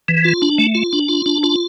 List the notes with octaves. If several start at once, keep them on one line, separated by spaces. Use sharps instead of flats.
E3
F4
D4
A3
F4
D4
F4
D4
F4